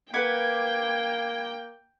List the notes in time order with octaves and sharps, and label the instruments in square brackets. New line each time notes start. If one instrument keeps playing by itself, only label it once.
[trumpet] A#3 [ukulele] B4 F#5 [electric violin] G5 [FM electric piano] B5 D6 G#6